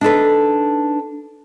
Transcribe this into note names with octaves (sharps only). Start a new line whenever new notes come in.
D4 D#4 A4 B4